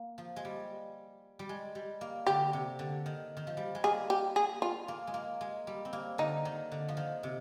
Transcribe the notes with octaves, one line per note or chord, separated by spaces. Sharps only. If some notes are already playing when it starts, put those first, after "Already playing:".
Already playing: A#3
F3
G#3
G3
G3
G#3
G3
A#3
D3 G4
C3
D3
D#3
D#3
F3
G3
G#3
A#3 G#4
G4
G#4
F4
A#3
G#3
A#3
G#3
G3
C4
A#3
D3 D#4
D#3
D3
F3
D#3
C3